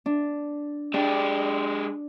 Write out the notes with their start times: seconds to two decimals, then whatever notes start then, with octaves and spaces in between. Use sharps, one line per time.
0.06 D4
0.94 G#3 D4 G4